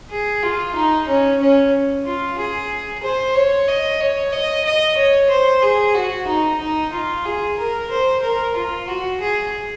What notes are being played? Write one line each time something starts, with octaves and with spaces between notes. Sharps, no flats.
G#4
F4
D#4
C#4
C#4
F4
G#4
C5
C#5
D#5
C#5
D#5
D#5
C#5
C5
G#4
F#4
D#4
D#4
F4
G#4
A#4
C5
A#4
F4
F#4
G#4